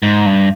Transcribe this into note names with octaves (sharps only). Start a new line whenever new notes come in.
G#2
G2